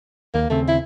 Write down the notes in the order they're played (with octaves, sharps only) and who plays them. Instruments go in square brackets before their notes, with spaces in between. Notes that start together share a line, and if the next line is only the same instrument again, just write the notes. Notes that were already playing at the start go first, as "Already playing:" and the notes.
[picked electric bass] D#2 [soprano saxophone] A#3
[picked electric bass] D#2 C#3 C4 [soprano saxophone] A3
[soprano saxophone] E4